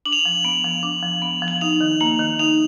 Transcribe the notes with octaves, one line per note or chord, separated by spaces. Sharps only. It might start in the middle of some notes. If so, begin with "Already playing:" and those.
D4 F#7
F7
F#7
F3
B3
F3
D4
F3
B3
F3
F#7
D#4 F7
D#3
A#3 F#7
D#3
D#4 F7